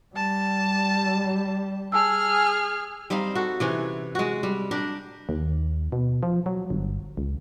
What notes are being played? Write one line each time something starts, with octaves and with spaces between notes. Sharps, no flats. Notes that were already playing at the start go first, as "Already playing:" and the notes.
G3 A5
G#4 G#5 A5 E6 F6
G3 C4 D#4 F5
F#4 A4
C3 E3 C#4
G#3 F#4
G3
D4 G4 A#4
D#2
B2
F3
F#3
G1
C#2